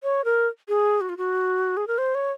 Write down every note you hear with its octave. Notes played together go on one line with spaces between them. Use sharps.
C#5
A#4
G#4
F#4
F4
F#4
G#4
A#4
C5
C#5